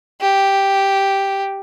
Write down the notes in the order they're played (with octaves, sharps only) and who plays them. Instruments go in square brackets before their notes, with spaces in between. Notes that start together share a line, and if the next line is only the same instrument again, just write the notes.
[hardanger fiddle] G4